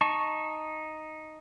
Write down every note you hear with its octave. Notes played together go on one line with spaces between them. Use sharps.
D#4 A5 C#6